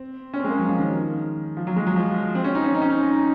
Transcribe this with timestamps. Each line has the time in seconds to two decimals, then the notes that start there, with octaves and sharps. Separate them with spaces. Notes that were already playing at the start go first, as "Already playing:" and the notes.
Already playing: C4
0.34 C#4
0.39 G#3 C4
0.50 A#3
0.59 F#3
0.69 F3
0.79 D#3
1.57 F3
1.67 F#3
1.76 G#3
1.86 F#3
1.96 F3
2.15 F3
2.35 C4
2.44 C#4
2.55 D#4
2.64 C#4
2.75 D#4
2.82 C#4
2.90 D#4